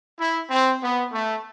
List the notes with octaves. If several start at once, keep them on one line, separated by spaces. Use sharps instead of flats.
E4
C4
B3
A3